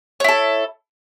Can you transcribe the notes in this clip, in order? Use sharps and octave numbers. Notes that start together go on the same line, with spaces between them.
E4 A4 C#5